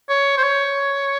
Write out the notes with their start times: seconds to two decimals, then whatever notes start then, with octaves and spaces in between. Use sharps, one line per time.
0.09 C#5
0.38 C5
0.43 C#5